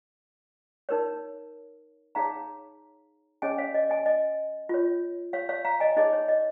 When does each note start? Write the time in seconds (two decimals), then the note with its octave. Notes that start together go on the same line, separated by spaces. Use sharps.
0.89 D#4 A#4 C#5
2.15 D#4 G#4 C#5 F5 A#5
3.42 C#4 G#4 C#5 D#5 G#5
3.58 C#5 F5
3.75 D#5
3.90 D#5 G#5
4.06 D#5
4.69 F4 C#5
5.33 C#5 F5
5.49 C#5 F5
5.65 F5 A#5
5.80 D#5 G#5
5.97 D#4 G#4 C#5 D#5
6.13 C#5
6.28 D#5